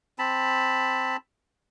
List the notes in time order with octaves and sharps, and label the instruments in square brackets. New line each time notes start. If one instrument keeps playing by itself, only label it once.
[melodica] C4 A5 B5